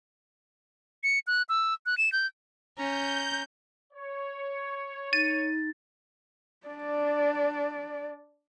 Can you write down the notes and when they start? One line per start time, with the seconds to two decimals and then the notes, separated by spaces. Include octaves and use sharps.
1.03 C#7
1.27 F#6
1.49 E6
1.86 F#6
1.98 E7
2.12 G6
2.78 C#4 A#5 G6
3.93 C#5
5.13 D#4 A6 D#7
6.67 D4 D5